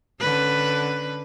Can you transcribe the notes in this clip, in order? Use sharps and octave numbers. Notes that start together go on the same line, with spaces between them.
D3 C#4 B4